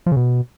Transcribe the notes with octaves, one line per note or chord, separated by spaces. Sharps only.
F3
C#3
B2